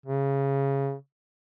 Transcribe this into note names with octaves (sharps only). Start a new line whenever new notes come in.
C#3